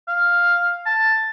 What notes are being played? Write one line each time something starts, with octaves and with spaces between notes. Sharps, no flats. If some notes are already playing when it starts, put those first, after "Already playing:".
F5
A5